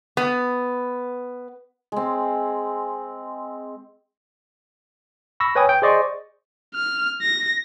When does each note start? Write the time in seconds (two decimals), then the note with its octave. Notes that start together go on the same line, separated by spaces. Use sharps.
0.17 B3
1.92 G#3 C4
5.40 B5 C#6 E6 A#6
5.55 B4 C#5 G5 G#5 D#6
5.69 G5
5.82 G#4 C5 D5 D#5 C6 C#6
6.75 F6
7.22 A#6